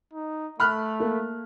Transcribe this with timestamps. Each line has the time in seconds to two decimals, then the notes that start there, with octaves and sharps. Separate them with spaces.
0.13 D#4
0.60 A3 B5 F6 F#6
1.00 A#3 A4